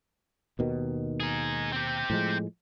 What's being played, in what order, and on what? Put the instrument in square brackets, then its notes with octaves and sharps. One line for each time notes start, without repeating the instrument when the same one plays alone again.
[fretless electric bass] D#2 B2 D#3
[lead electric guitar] D#4 G#4
C4 G4
[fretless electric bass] A2 F3 G#3